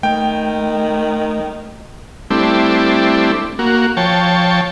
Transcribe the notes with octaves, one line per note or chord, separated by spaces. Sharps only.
D#3 A3 G5
G3 A3 C4 D4 E4
A#3 F#4
F3 C#5 G5 A5